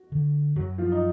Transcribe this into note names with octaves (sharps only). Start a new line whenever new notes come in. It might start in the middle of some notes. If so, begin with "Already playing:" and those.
Already playing: F#4
D3
F#2 F#3 F#4
F3 F4
D#4